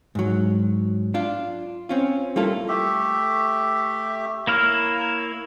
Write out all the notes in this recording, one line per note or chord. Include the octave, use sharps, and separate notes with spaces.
G#2 F#3
D4 F4
C4 C#4 F4
G3 A3 A#3 E4 F4 A4
A3 G4 E5
A#3 E4 C#5 F6